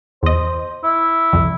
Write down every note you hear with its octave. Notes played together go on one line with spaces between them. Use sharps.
E2 C5 D#5
E4
C2 F2